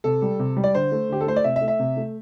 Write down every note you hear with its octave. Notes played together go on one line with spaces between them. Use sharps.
C3 A4
G3
C3
G3
D5
D3 C5
A3
D3 G4
A4
A3 C5
D5
C3 E5
E5
A3
E5
C3
A3